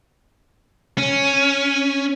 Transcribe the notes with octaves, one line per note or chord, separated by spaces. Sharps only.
C#4